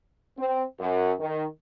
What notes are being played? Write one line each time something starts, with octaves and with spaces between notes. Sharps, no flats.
C4
F#2
D#3